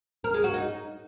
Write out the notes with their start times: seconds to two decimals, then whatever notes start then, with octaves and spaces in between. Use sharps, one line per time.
0.24 A#4
0.34 G#3
0.44 F#4
0.54 D#4